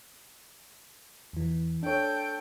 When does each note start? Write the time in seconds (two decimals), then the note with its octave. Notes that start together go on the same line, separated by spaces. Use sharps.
1.33 E2 E3
1.83 D4 A4 C#5 G5